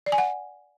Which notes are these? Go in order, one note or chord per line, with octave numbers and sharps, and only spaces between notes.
D5
G#5
F#5